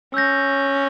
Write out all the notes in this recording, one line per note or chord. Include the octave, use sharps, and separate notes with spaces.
C#4 E6 G6 A#6